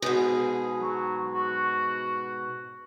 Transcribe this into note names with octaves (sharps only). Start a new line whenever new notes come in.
G#2 B2 G#4
F#3
F#4